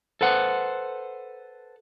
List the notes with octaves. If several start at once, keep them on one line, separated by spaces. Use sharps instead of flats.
A4 B4 C5 F#5